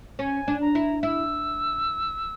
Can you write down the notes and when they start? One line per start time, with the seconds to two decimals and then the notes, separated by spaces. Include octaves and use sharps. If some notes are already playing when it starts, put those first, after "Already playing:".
0.19 C#4 G#5
0.48 D4
0.61 A#5
0.75 E4
1.03 E4 E6